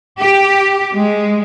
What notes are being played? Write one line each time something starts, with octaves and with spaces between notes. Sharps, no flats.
G4
G#3